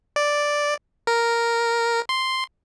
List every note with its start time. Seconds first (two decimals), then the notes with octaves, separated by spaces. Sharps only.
0.16 D5
1.07 A#4
2.09 C6